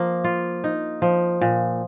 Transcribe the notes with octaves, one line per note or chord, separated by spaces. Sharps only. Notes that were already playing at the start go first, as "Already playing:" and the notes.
Already playing: F3 A#3
F4
D#4
F3
A#2